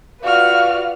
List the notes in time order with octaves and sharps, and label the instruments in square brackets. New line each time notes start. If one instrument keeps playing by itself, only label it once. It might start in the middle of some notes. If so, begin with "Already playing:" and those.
[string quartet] F4 B4 D5 [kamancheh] F#4 F6 [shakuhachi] F5